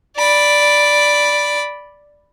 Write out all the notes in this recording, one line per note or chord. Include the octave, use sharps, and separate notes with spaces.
D5 B5